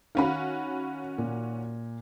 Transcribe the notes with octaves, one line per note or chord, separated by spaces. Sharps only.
D#3 C#4 F#4 F5 B5
A#2